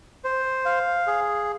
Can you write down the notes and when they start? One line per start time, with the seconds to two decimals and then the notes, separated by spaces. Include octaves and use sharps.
0.24 C5
0.65 F5
1.07 G#4